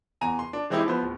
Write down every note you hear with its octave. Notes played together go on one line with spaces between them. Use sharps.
E2 G#5 A#5 D#7
C6
D4
E3 G#3 C4 D#4 E4 G4
F3 B3 C5
D1